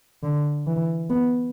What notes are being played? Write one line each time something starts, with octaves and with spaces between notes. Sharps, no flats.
D3
E3
B3